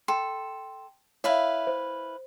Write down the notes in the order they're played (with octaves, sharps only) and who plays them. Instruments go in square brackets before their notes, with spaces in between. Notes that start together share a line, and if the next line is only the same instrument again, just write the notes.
[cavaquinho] A4 [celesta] G5 C6
[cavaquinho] E4 B4 F5 [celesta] C#5 E5
[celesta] C5